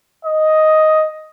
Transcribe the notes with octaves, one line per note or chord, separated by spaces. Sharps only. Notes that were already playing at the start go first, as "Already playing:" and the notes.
D#5